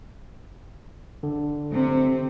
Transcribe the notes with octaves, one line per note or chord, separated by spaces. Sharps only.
D3
C3